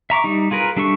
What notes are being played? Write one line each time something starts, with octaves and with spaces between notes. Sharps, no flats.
E5 A#5 C#6 D6
G3 D#4
F4 G#4 A#4 B4
G3 D4 A4 E5 C#6